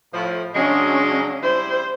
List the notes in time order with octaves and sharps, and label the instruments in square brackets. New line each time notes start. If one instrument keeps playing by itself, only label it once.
[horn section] A2 F3
[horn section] C#3 F#3 G#3 [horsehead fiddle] C#4 D4
[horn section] G3 E4 [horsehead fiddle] C5